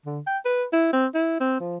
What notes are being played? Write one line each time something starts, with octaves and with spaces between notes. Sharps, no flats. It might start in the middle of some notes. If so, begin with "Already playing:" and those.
D3
G5
B4
E4
C4
E4
C4
F3